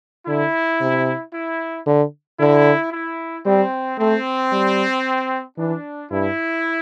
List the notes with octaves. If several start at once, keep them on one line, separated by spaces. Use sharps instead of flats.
D3 E4
C3
E4
D3
D3 E4
E4
G3 C4
A3 C4
G3
E3 D4
G2 E4